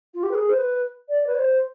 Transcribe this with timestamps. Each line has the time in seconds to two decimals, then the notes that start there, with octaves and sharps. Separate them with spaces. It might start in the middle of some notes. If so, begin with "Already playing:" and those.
0.14 F4
0.23 G4
0.31 B4
0.35 G#4
0.49 C5
0.57 B4
1.09 D5
1.27 B4
1.35 D5
1.39 C5